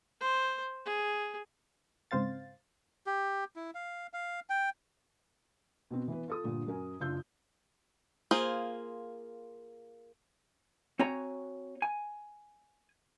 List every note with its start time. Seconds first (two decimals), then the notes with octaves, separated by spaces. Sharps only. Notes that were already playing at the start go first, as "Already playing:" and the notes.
0.21 C5
0.85 G#4
2.11 G#2 C#3 C4 C5 F5 A6
3.06 G4
3.56 E4
3.75 F5
4.13 F5
4.50 G5
5.91 B2 B3 C4 F#4
6.08 E3 B3 B4
6.28 F4 A4 D#6
6.44 G2 A#2 D3
6.67 F#2 A#4 G#5
7.00 F#1 D4 F4 E6 G6
8.31 A#3 F4 G#4 C5
10.99 C4 F#4 C#5 G#5 A#5
11.82 G#5